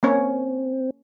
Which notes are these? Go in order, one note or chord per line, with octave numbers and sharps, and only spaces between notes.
A#3 C4 C#4 C#5